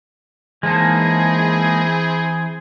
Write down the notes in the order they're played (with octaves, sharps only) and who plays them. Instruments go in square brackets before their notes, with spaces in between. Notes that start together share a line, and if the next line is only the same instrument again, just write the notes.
[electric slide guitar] E3 A5 [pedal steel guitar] G#3 A#3 D#4 [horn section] C4 E4 G#4